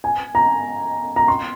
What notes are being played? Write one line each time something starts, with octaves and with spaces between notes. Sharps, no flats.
G#5
A#5
A#5
C6